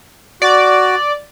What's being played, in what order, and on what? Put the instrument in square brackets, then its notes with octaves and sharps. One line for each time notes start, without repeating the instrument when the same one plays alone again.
[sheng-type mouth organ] F#4 [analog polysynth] D5